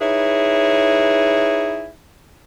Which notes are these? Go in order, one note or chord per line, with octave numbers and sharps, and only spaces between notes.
D#4 E4 G#4 B4 C#5